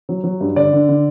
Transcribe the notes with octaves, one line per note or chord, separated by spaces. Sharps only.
F#3
F#3
G2
D3 D5
D3
D3